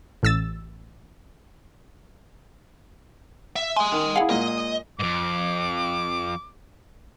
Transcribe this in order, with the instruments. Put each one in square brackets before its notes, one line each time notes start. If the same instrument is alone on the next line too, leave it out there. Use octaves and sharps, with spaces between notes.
[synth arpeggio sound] A1 E6 A6
[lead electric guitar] E5
[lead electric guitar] D#5 C6 [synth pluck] G#5
[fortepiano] D#3
[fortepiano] E4 G#4 [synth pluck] F5 F#5
[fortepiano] A#2 G#3 [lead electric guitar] D#5
[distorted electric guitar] F2 G#2 [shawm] D6